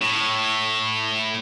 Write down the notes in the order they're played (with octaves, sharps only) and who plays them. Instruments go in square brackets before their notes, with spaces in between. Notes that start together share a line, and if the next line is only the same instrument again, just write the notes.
[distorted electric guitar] A2